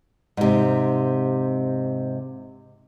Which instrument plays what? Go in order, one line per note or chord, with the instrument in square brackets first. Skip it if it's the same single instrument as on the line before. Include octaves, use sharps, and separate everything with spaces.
[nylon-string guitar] G#2 C3